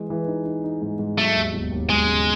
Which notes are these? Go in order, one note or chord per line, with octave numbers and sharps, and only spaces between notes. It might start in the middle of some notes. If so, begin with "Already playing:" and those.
Already playing: E3 G#3
E3
D#4
D#4
D#4
G#2
G#2
F#3 A3
D#2
E1
D#2
E1 G#3
C#3